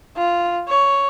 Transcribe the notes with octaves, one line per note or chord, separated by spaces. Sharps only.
F4
C#5